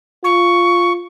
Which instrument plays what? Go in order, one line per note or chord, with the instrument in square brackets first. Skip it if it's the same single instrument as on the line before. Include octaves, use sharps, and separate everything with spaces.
[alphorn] F4 [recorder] C#6